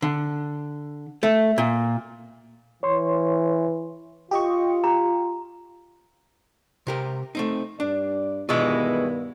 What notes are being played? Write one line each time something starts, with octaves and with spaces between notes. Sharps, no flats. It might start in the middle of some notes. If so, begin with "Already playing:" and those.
D3
A3
A#2
E3 C#5 C6 C#6
F4 G4 D#5 C#6
G4 A#5
C3 G4 A#4
A3 C4 D#4
G2 D4 D5
G2 B2 D#3 E3 G#3 B3 F4